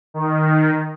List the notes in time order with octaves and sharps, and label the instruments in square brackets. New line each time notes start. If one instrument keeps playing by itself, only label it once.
[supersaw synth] D#3